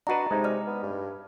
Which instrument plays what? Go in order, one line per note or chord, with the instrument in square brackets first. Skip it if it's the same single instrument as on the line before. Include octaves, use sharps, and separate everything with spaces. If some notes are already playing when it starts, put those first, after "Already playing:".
[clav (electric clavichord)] D4 F#4 B4 [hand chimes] D#5 A#5
[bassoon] C3 [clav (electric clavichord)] G#3 D#4
[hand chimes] D5 F6
[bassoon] B3
G2